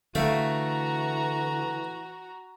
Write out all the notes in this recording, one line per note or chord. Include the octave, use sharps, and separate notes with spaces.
D3 E3 A3 F#4 F5 G5 A#5